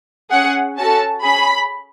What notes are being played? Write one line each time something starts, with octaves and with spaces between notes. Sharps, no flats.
C#4 G#4 F#5
C#4 F#4 A4 A5
C#4 G#4 B5